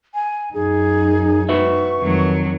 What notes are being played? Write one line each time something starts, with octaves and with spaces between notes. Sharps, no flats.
G#5
F#2 D#4 G#4
F#4 B4 E5 C#6
F2 D#3 F#3